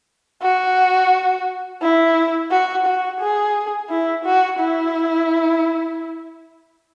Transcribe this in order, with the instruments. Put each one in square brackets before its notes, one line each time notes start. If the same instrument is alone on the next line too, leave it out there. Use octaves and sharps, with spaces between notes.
[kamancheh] F#4
E4
F#4
F#4
G#4
E4
F#4
E4